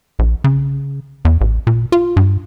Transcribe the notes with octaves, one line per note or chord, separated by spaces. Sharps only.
A#1
C#3
E2
A1
A#2
F4
G2